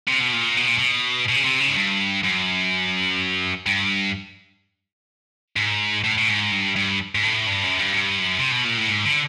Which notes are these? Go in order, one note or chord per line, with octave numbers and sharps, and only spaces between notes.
C3
B2
A#2
B2
A#2
B2
B2
C#3
C3
C#3
G#2
G2
F#2
G2
G#2
A2
A2
G#2
G2
G2
G#2
A2
G2
F#2
G2
G2
F#2
C3
B2
A#2
A2
G#2
D3